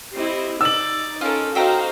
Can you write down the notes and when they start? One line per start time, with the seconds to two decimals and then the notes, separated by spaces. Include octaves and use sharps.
0.14 C4 E4 G4 D#5
0.61 D#4 D5 E6 F#7
1.21 C#4 F4 A4 A#4
1.55 D#4 F#4 C5 E5 F5 G5 A#5